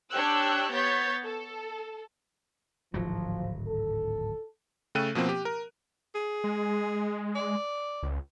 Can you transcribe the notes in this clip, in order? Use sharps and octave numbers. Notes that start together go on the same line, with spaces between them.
D4 G4 C#5 G5 E6 F#6
B3 C#5 G6 A6 B6
A4
D1 G#1 F3 F#3
A4
C#3 A3 A4 G5 F#6 D#7
B2 F3 A#3 C4
G4
A#4
G#4
G#3
D5
C#2